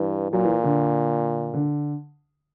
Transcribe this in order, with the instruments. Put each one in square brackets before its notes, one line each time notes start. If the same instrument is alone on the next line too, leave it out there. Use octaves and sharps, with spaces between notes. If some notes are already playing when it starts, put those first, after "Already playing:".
Already playing: [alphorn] G2 [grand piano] E3
[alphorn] A#2 [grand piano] F#3
[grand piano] E3
D3
D3